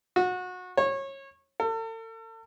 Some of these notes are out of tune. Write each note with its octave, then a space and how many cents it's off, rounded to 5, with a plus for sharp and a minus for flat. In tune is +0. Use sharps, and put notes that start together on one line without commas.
F#4 -25
C#5 -25
A4 +40